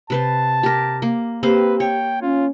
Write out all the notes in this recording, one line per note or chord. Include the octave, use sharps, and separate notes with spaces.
C3 B4 C5 A5
G4 A#4
A#3
A#3 C4 G4 B4 C5
C#5 G5
C#4 F4